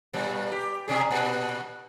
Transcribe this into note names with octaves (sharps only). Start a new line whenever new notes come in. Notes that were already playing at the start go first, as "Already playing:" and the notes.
G2 A#2 G3
G4
B2 C#4 G#4
A#2 B3